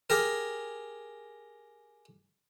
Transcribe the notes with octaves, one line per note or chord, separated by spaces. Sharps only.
G4 G#4 A#4